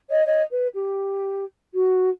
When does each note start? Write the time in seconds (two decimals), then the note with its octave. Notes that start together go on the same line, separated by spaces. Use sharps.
0.09 C#5 D#5
0.25 C#5 D#5
0.50 B4
0.75 G4
1.74 F#4